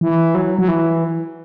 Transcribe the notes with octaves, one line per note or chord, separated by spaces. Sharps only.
E3
F#3
F#3
E3